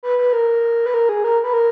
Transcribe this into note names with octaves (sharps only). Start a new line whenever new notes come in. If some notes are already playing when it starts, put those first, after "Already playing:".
B4
B4
A#4
B4
A#4
G#4
A#4
B4
A#4